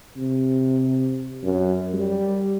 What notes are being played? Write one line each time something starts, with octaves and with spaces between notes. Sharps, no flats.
C3
F#2
G3